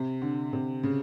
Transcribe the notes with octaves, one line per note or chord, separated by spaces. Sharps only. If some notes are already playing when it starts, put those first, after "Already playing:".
Already playing: C3
D3
C3
C#3